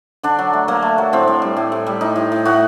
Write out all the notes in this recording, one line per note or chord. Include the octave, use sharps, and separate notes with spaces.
D3 D4
F#3
A3
F#3 A#3
A3
F#3
A2 C4
A2
G3
A2
A2
G3
A2 D#4
A2
A2
A2 F#4